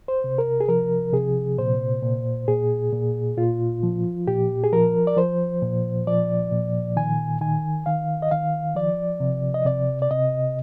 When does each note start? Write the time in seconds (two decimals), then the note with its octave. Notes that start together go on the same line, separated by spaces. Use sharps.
0.08 C5
0.24 C3
0.38 A#4
0.61 G#4
0.69 F3 A#4
1.13 C3 G#4
1.59 A#2 C5
2.03 A#2
2.48 A#2 G#4
2.93 A#2
3.37 A#2 F4
3.83 F3
4.28 A#2 G4
4.64 G#4
4.72 F3 A#4
5.07 D5
5.17 F3 C5
5.63 A#2
6.07 F3 D5
6.51 A#2
6.96 D#3 G#5
7.41 D#3 G#5
7.86 D#3 F5
8.22 D#5
8.31 D#3 F5
8.75 F3 D5
9.20 C3
9.54 D#5
9.65 C3 D5
10.02 D5
10.11 C3 D#5